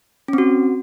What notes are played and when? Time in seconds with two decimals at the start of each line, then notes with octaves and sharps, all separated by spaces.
0.28 C#4
0.33 C4
0.38 F#4